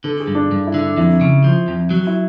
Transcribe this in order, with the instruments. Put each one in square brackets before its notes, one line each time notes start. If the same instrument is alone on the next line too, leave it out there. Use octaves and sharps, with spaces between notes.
[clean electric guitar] D3 [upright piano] A4
[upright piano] G#4
[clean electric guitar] G2
[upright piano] D4
[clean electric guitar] G2
[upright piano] E4
[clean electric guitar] D3
[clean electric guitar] F2 [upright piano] E4
[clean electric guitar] C#3
F3
F2
F#3
[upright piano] E4